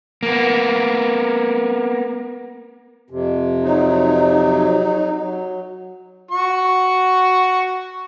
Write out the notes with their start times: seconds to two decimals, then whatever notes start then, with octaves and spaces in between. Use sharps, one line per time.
0.23 A#3 B3
3.10 F2 C3
3.64 F#3 D#4
5.21 F#3
6.31 F#4 C#6